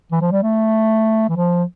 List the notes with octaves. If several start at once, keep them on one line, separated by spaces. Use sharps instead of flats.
E3
F3
G3
A3
E3
F3